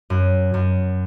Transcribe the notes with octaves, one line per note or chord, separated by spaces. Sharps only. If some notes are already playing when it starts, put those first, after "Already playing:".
F#2
F#2